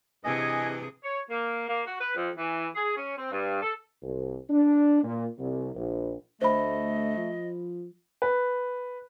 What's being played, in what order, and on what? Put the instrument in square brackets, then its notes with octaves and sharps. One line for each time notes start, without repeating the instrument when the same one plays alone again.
[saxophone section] G2 E3 [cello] C3 G#4 [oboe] D#5 [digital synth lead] G#5
[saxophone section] C#5
A#3
A#3
F#4
B4
F2
E3
G#4
C#4
C4
G2
A4
[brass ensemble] C2
D4
A#2
C2
A#1
[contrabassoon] D2 [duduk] A3 [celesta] C5 B5 [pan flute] D#5
[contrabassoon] F3
[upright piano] B4